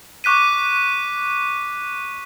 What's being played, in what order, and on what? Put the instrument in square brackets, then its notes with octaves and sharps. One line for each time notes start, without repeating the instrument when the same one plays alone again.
[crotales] C#6 D6 F#6 B6 D#7